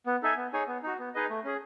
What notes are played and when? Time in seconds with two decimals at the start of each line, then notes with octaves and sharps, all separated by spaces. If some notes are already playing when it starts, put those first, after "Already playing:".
0.06 B3
0.23 D#4 A4 E5 G#5
0.37 B3
0.53 D#4 G#4 C#5 G#5
0.68 B3
0.83 D#4 F#4
0.99 B3
1.14 D#4 G#4 B4 D#5
1.30 A3
1.44 C#4 G#4